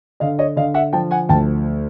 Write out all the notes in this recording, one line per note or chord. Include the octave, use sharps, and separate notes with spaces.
D3 D#5 F5
C#5 D#5
D3 D#5 F5
E5 F#5
F3 G5 A5
F#5 G#5
D2 G5 A5